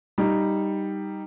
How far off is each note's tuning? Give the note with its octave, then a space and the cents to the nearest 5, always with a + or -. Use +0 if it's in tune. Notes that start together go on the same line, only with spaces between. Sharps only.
G3 +0 D#4 +0